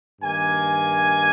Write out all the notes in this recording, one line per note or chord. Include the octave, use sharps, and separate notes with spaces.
G2 D#3 A#3 G#5